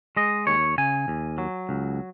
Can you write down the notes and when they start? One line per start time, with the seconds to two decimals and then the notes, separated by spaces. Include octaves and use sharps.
0.17 G#3 D#5
0.47 D#2 C#5
0.78 C#3 G#5
1.08 D#2
1.38 F#3
1.69 C#2